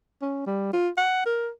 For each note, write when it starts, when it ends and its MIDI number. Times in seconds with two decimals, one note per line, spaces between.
0.22 0.44 61
0.47 0.69 55
0.73 0.89 65
0.98 1.22 78
1.26 1.49 70